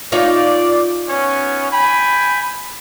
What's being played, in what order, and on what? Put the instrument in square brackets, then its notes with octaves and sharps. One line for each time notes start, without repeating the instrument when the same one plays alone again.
[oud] D#4 F4 C#5 [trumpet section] D5
[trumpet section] B3 C#4
G5 G#5 B5